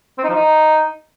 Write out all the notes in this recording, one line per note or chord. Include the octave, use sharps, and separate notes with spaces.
C4
D#4
F3
D#4